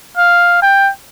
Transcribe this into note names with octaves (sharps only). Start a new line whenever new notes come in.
F5
G5